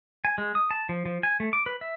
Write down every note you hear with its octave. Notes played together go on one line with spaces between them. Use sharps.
G#5
G#3
D#6
A5
F3
F3
G#5
A3
D6
B4
E5